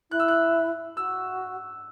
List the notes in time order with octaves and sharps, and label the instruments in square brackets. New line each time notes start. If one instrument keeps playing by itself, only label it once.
[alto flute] E4 [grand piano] F#6
[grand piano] E6
F#6
[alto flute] F#4 [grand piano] E6